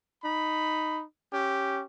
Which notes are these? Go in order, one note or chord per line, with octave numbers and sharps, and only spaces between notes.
D#4 B5
C#4 G4